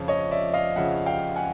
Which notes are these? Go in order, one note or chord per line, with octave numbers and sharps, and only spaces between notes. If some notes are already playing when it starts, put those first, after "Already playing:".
Already playing: F2 C#3 F3
C#5 D#5
D5 E5
D#5 F5
F2 C#3 F3 E5 F#5
F5 G5
F#5 G#5